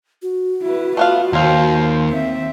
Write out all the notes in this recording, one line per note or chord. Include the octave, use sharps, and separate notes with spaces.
F#4
E4 B4
A3 B3 F4 F5
D#2 A#3 F4 C5
C4 E5